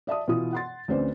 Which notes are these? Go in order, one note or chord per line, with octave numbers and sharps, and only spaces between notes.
D5 E5 A5 D#6
B2 E3 F4 D#6
F#5 C6 A6
D2 C4 C#4 B4 C5 D5